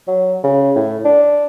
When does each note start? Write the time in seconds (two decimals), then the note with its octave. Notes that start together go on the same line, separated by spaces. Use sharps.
0.08 F#3
0.44 C#3
0.76 A2
1.05 D4